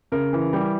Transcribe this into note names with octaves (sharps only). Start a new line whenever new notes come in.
C#3 A#4
E3
G3